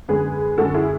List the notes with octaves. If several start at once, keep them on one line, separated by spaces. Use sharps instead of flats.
F#2 D3 G#3 G#4 B4
F#2 D3 G#3 F#4 A4
E4 G#4